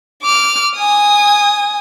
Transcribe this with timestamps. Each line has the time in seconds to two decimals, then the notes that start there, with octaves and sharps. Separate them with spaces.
0.22 D6 F6
0.76 G#5 D#6